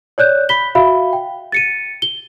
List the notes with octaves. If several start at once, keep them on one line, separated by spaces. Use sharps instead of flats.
C#5 D5 F#6 G6
B5 B6 G7
F#4 E5 F5 B5
G5
A6 C#7 D#7
G7